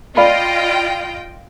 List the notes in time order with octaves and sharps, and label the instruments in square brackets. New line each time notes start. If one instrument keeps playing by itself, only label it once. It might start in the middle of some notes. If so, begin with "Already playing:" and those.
[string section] F4 D#5 G5 [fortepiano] D5 F5 B5